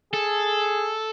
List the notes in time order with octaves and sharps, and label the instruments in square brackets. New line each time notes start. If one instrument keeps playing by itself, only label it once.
[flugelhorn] G#4 [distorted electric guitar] A4